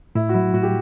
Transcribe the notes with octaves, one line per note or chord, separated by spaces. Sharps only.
A2 E4
F#4
F#3 E4
A2 F#4
G4